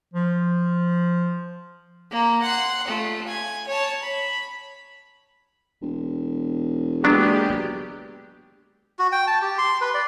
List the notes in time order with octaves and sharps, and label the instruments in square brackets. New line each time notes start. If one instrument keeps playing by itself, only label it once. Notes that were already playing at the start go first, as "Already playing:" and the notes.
[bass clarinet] F3
[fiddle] A#3
F#5 C6
A3 F4
G#5
C#5 A5
B5
[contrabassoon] E1
[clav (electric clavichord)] F#3 B3 D4 [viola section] G#3 A#3 G4
[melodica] F#4
G5
A5
G4
C6
B4
D5